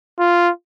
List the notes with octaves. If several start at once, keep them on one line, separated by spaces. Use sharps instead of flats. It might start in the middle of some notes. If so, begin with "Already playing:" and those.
F4